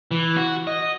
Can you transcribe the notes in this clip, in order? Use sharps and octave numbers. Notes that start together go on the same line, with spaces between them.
E3
F#4
D#5